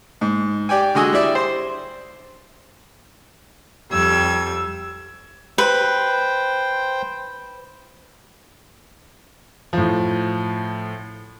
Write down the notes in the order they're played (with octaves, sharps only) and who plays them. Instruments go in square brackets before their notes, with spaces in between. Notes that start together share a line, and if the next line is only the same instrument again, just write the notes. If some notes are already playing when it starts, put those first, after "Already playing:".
[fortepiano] G#2
G4 D5 G5 G#5
D3 G#3 F#4 D#5 G#5 E6
G3 E4 D5 E5
C5 C6
[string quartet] F2 G3 E6 G#6
[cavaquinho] B4 [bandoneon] C5 G5
[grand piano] A2 F3